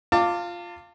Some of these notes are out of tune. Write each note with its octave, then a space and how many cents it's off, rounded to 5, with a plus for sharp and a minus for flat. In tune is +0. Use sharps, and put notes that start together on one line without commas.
F4 +0 A5 +35 D6 -5